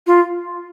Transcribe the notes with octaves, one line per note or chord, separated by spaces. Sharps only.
F4